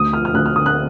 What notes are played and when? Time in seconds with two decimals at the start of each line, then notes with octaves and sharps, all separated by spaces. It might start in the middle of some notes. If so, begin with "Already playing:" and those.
Already playing: D2 D#6
0.13 F3 F6
0.25 F6
0.34 D2 F#6
0.46 F6
0.55 D3 D#6
0.66 F#6